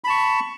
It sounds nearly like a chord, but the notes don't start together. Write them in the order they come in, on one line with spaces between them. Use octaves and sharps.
B5 A5 C#6